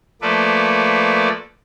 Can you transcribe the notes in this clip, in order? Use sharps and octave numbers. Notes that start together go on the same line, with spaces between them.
F3 A3 A#3 A4 B4 D5